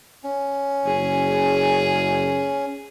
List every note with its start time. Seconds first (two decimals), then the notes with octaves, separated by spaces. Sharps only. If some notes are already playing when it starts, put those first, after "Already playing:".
0.24 C#4
0.86 F#1 G#4